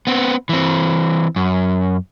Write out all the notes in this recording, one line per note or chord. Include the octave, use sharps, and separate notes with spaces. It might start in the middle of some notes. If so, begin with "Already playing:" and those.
B3 C4
E3 C4
F#2